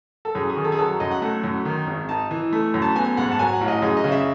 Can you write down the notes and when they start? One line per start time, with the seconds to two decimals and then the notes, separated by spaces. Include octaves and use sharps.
0.25 A4
0.35 F#2 G#4
0.49 G#4
0.57 D#3
0.65 A4
0.72 G#4
0.79 F#3 A4
1.00 F#2 D#5
1.11 F#5
1.22 A3 F#5
1.44 F#2
1.65 D#3
1.87 G#1
2.09 D#4 A5
2.31 E3
2.53 A3
2.74 F#2
2.82 A5
2.95 B3 G#5
3.17 G#2 F#5
3.32 A5
3.39 F#3 G#5
3.53 F#5
3.61 A1
3.68 D#5
3.82 F#2 G#4
3.97 D#5
4.04 C#3
4.12 E5